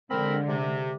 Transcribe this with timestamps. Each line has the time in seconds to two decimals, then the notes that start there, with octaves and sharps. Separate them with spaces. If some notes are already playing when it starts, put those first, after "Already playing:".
0.11 D3 G#3 C4 A#4 B5
0.48 C3